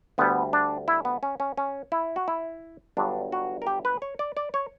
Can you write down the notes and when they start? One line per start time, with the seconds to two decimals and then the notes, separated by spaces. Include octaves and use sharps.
0.18 D2 D3 G3 B3
0.53 D4
0.88 E4
1.05 B3
1.23 C#4
1.40 C#4
1.57 C#4
1.92 E4
2.16 F#4
2.28 E4
2.97 G1 G2 F#3 D4
3.32 F#4
3.62 A#4
3.67 G4
3.85 B4
4.02 C#5
4.19 D5
4.37 D5
4.54 C#5